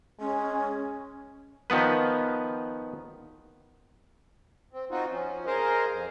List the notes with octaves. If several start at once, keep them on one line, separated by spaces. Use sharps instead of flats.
G#3 C#4
D#3 F3 B3 B4
C4
C4 D#4 F4 F#4
F3 C#4
G#4 A#4 C5 D#5 F5
F2